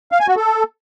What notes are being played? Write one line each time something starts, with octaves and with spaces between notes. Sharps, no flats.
F5
G#5
F#4
A4